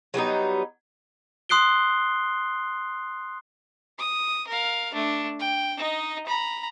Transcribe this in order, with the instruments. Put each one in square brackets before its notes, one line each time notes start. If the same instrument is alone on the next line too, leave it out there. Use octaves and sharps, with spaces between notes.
[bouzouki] F#3 G3 B3 D#4
[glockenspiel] C6 D#6 F#6 C7 D7 G7
[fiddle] D#6
A#4 F5
A3 D4
G5
D#4 D#5
A#5 B5